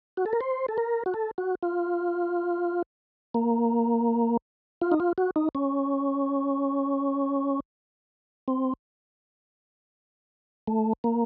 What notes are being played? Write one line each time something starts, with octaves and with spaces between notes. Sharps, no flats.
F#4
A4
A#4
C5
A4
A#4
F#4
A4
F#4
F4
A#3
F4
D#4
F4
F#4
D#4
C#4
C4
A3
A#3